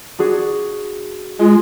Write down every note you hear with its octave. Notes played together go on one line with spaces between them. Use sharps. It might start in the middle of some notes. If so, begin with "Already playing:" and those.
D4 F#4 G#4
G#3 F4